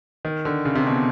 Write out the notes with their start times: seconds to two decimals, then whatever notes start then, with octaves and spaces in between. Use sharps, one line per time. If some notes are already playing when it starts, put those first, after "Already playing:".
0.25 D#3
0.45 D3
0.65 C#3
0.75 C3
0.87 B2